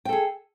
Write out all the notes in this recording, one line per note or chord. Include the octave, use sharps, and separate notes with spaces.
G#4 A4 G5